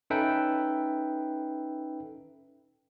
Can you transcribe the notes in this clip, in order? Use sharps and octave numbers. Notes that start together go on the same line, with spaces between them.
C#4 D#4 A4 B4 E5 G5